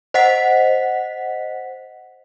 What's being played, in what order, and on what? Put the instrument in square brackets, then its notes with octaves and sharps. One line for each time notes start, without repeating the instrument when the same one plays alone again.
[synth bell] C5 D#5 F#5 B6